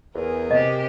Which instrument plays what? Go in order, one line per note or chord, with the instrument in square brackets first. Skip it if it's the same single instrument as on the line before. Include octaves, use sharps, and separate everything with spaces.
[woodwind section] E2 [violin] G#4 A#4
[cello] C3 G4 [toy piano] D#5